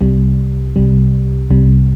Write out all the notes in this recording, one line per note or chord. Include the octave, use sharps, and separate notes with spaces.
C2 C3 G3
C2 C3 G3
C2 C3 G3